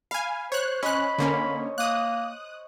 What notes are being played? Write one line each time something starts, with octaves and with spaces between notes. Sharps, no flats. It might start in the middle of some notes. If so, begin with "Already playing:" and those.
F5 G#5 B5
C5 C#5 F#6
C#4 C5 C#5 D#5 B5 F#6
D3 A#3 C#4 C5 C#5
A#3 D#6 F#6